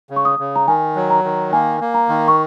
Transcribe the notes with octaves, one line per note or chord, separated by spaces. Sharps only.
C#3
C#6
D#6
C#3
A#5
D#3 G#5
F#3
A#5
D#3
A#3 G#5
A#3
A#5
D#3
C#6